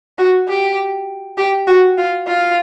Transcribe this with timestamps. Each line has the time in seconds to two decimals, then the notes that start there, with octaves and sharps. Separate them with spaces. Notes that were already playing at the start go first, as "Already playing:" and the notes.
0.18 F#4
0.48 G4
1.37 G4
1.67 F#4
1.98 F4
2.27 F4